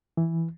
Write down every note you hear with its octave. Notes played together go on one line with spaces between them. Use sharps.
E3